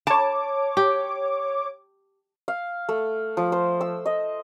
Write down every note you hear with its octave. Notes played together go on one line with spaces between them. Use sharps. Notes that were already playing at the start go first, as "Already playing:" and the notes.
C#5 A5 D6
G4
F5
A3
F3
C5
E6
D#5